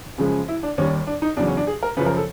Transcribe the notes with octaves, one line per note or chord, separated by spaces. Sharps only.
F#2 C#3 F3 G#3
E4
D4
D#2 D#3 G3 C#4
D4
D#4
E2 C#3 F#3 D4
C#4
D4
G#4
A#4
F#2 C#3 F3 B4
A#4
A4